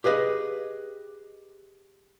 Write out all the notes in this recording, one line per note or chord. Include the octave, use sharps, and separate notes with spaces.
G4 G#4 B4 D#5